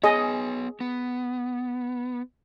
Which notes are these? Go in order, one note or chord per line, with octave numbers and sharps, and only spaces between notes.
B3 G#4 C#5 D#5
B3